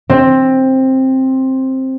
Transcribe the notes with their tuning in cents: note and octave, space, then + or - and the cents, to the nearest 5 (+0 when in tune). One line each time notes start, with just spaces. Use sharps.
C4 +10